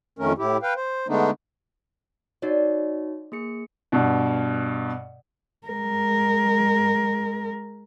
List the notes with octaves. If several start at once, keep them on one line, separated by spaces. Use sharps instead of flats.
F2 D#3 A3 C#4 A#4
A2 E4 G4
B4 F5 G5
C5
D3 G#3 A3 B3 D4 D#4
D#4 F#4 C#5 D5
A#3 G#4 C#7
G2 B2
G#3 A#4